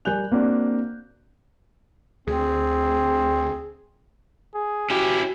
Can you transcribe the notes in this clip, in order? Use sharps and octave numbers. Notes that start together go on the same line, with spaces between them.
G3 A#4 G#5 F#6 G6 F7
A#3 C4 D4 F#4
D2 C4 G#4
G#4
C#4 E4 F#4 G4